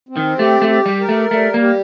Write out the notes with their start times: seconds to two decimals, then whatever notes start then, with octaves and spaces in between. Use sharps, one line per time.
0.09 C4
0.17 D#3
0.39 A3 G4
0.62 A3
0.70 G4
0.86 G3
1.00 A#4
1.09 A3
1.31 G3 A3
1.54 A#3
1.62 G4